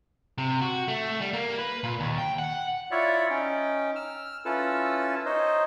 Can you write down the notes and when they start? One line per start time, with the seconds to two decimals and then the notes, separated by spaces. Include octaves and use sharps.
0.38 C3
0.61 F#4
0.88 A3
1.21 G3
1.33 A#3
1.59 B4
1.84 A#2
2.00 D#2
2.18 G5
2.39 F#5
2.91 E4 F4 C#5 D5 E5 F#5
3.30 C#4 D#4 G5
3.95 E6 F6
4.45 C#4 E4 F4 A4 B4 E6
5.25 D#4 C5 C#5 D#5